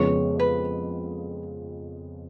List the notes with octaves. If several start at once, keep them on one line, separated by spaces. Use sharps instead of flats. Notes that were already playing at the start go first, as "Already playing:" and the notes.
Already playing: F2 C#3 F3 G#3 B3 C#5
B4